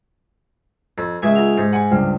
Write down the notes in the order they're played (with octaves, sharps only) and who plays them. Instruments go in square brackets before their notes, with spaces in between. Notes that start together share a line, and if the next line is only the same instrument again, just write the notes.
[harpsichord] F2 [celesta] A#5
[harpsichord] C#2 E5 G#5 [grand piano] G#4
[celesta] F4 F#5 F7
[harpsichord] G#2 [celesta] G4 G6
[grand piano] F#5 G#5
[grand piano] C#2 G2 [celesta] C5 G5 F6